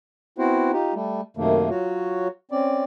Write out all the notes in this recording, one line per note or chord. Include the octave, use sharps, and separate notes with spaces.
B3 C4 E4 F#4 C5
D#4 F4 G4
G3 A3
F#2 C3 D#3 A3 A#3
F#3 F4 F#4 C#5
C4 C#4 D5